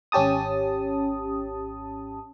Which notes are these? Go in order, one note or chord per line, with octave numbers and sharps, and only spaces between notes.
G#1 C#4 G4 A5 D#6